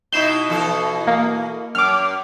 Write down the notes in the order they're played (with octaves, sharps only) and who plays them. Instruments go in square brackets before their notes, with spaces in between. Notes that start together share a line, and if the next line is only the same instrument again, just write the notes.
[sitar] B2 D#4 E4 [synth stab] G6 C7 E7
[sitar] B2 E3 A4
[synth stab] A#3
[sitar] F#2 [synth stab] D6 F6